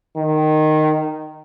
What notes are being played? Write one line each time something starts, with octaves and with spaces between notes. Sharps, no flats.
D#3